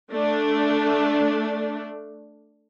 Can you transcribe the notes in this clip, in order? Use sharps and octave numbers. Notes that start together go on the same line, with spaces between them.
A3 D4